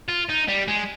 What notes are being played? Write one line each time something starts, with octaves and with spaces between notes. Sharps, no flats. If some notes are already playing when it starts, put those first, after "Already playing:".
F4
D#4
G3
G#3